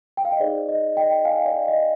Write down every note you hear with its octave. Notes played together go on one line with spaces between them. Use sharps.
G5
F5
D#5
D#4 G#4 C5 D5
D#5
D#5 G5
F5 G#5
D5 F5
D#5